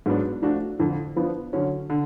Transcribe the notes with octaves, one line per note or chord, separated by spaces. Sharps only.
G#2 F#3 B3 D4
F3 A3 D4 F#4
F2 D3 F3
F3 B3 D4 F4
D3 F#3 C#4
D3